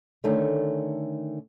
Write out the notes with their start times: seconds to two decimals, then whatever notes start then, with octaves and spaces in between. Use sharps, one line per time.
0.24 D3 D#3 A3 C#4